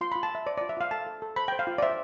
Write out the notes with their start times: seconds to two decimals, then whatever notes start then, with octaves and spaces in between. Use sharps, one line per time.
0.01 F4 C6
0.12 B5
0.15 F4
0.23 A5
0.31 F4 E5
0.46 C5 D5
0.58 D5
0.61 F4
0.69 E5
0.77 F4 F5
0.91 A4 A5
1.06 A4
1.22 A4
1.36 C5 B5
1.48 G5
1.52 C5
1.59 F5
1.67 F4
1.78 D5
1.82 C5 E5